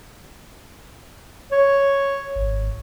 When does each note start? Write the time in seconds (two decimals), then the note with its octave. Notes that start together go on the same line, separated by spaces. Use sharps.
1.52 C#5
2.36 G#1